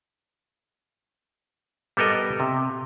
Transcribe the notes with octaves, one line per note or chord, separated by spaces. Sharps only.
G3 B3 A4 A#4 D#5
C3